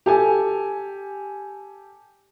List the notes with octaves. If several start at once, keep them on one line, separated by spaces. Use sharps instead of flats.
G4 A4 G#5